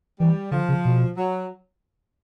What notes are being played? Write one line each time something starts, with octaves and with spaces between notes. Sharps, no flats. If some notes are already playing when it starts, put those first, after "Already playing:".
E3 G3
D3 F3
C#3
B2
F#3